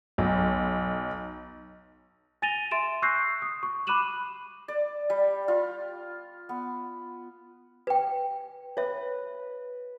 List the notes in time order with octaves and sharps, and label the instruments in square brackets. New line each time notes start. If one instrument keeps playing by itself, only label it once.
[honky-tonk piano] B1
[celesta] G#5 A6 A#6 D#7 F7 G7
E5 C6 A6 D7 E7
C#6 E6 F#6 G6 A#6 C7
D#6
C#6
B5 D6 F#6 D#7 E7 F#7
[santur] D5
G3
F4
B3
[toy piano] B4 G5
[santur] B4 [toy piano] C#5 E5